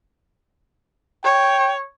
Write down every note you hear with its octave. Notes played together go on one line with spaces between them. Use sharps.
C#5 G5